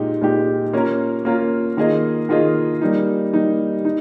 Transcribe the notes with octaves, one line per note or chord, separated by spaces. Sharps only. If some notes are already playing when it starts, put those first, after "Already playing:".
Already playing: A#2 G#3 D#4 G4
A#2 G#3 D#4 G4
A#3 C#4 F4 A#4
A#3 C#4 F4 A#4
D#3 A#3 F4 G#4 D#5
D#3 A#3 F4 G#4 D#5
G3 A#3 D#4
G3 A#3 D#4
D#4